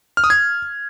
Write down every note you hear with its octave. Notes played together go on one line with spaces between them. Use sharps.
F6
D#6
G#6